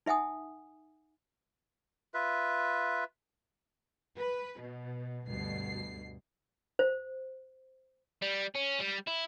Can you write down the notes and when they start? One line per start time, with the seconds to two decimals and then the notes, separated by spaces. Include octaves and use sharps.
0.06 D#4 E5 F#5 G#5 D#6
2.14 F4 B4 E5
4.18 B4
4.61 B2
5.27 D2 G2 B2 C7
6.79 C5
8.22 G3
8.56 C#4
8.80 G3
9.08 E4